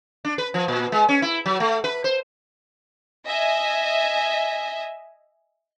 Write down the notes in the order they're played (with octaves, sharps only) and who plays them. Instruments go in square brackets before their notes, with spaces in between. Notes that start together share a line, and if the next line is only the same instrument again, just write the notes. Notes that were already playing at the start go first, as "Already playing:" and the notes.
[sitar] D4
B4
F3
A#2
G#3
C#4
E4
F#3
A3
B4
C5
[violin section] D#5 E5 G#5